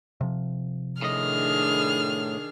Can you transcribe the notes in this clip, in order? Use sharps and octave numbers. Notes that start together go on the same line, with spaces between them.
C3 F3
A2 D#3 D4 G#4 D#5 F6